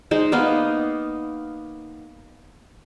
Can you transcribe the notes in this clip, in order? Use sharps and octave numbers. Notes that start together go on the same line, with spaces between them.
G#3 D#4 C5
A#3 B3 D#4 F5